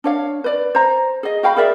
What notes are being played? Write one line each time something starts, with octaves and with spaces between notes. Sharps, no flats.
D4 C#5 F5
B4 D5
C5 A#5
G#4 D#5
F#4 F5 G5 B5
G#4 A#4 D5 E5